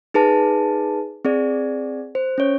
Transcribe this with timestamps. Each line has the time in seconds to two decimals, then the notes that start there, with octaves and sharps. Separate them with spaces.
0.14 D#4 G#4 B4 A5
1.25 C4 G#4 D5
2.15 C5
2.38 C#4 C#5